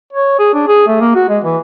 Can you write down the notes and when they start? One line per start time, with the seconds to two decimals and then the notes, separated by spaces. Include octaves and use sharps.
0.13 C#5
0.39 G#4
0.54 D4
0.68 G#4
0.87 A3
1.01 A#3
1.15 F#4
1.29 G#3
1.44 E3